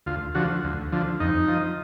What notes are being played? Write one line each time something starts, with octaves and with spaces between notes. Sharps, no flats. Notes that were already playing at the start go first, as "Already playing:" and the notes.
D2 F4
D3 F3 F#4
D2
D3 F3
F2 D#4
F3